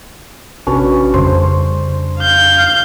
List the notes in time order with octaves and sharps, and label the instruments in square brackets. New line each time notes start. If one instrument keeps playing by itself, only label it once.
[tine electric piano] A1 C3 F#4 [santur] C#4 D4 B4
[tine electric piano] F2 [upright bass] C#3 G3 [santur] C5
[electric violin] F5 G6